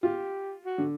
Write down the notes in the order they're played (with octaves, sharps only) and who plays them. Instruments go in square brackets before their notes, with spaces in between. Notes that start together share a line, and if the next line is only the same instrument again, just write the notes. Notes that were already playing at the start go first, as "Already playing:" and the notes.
[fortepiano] F4 [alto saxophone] G4
[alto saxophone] F#4
[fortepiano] D3